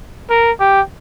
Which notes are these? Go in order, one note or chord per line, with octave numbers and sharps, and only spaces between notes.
A#4
G4